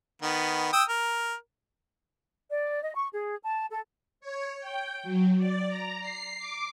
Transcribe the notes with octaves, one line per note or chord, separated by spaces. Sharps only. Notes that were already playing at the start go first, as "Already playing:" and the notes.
D#3 B3
G5 D#6 E6
A#4
D5
D#5
C#6
G#4
A5
A4
C#5
G5
F#3
D5
A#5
C7
D6